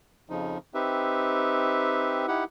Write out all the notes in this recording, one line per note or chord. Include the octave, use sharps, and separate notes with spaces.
F2 C#3 F3 D#4
C4 D#4 G4 B4 E5
D#4 E4 G4 F#5